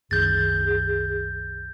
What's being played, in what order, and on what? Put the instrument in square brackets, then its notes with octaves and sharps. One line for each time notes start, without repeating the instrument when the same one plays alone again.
[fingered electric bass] C2 F#2 D#3 [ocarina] G#4 [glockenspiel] G6 A6